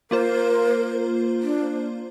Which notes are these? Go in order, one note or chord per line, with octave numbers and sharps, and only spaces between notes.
A#3 F4 A#4 C5
D4